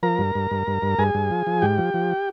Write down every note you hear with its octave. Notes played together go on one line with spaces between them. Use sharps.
F3 A#4 A#5
G2
G2
G2
G2
G2
G2 G#4 G#5
G2
F3
F3
G#2 G4 G5
F3
F3